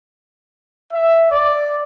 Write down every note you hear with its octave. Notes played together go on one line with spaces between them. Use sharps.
E5
D5